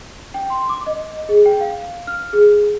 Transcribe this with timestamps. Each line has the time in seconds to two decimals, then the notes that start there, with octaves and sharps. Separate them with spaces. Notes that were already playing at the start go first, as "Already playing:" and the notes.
0.34 G5
0.50 C6
0.69 D6
0.87 D#5
1.29 G#4
1.46 G5
1.61 F5
2.07 F6
2.33 G#4